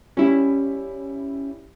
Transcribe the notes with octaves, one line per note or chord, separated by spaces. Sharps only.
G3 C#4 E4